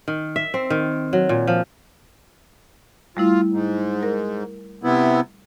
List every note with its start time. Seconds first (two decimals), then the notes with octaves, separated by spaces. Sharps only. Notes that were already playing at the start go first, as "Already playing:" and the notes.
0.08 D#3
0.36 E5
0.54 C4
0.70 D#3
1.13 F#3
1.29 A#2
1.47 F3
3.17 G3 A3 E4 F4
3.52 G#2
4.03 A#4
4.83 C3 B3 E4